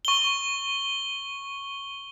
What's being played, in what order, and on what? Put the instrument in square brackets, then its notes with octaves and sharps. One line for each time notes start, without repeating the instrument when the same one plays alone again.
[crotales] C#6 G7